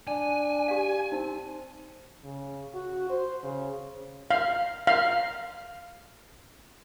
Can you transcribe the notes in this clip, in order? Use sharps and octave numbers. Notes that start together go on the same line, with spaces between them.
D4 G#5
G4 D5 F5
C4 D#4
C#3
F#4
C5
C#3
F5
F5